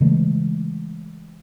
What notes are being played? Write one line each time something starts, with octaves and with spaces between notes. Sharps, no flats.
C#3 E3 G#3 A3